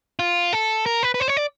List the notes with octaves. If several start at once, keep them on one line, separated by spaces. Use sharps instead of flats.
F4
A4
A#4
B4
B4
C5
C#5
D5